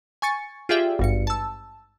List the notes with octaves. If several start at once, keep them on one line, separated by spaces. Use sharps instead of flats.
G#5 C#6 A6 C#7
F4 G4 G#4 D5 E5 G5
G#1 G2 C#7
A5 E6